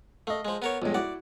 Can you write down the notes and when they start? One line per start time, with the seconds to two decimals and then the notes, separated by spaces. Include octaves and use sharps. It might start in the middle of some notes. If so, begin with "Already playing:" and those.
0.27 A3 D#5 F5
0.45 F3 G#3
0.62 B3 A#4 C#5
0.82 B1 G2 F3 G#3
0.94 E4 F#4 D5 F#5